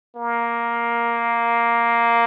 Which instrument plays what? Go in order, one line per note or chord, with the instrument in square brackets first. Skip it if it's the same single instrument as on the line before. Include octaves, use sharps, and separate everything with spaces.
[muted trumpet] A#3